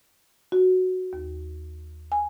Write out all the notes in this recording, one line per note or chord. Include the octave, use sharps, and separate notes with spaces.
F#4
D#2
G#5